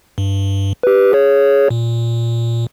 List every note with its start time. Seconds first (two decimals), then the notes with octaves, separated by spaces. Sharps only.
0.18 G2
0.83 G4 B4
1.13 G#4 C#5
1.70 A#2